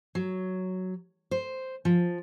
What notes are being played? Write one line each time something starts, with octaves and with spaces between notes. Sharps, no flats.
F#3
C5
F3